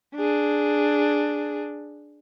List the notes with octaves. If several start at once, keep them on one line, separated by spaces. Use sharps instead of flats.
D4 G#4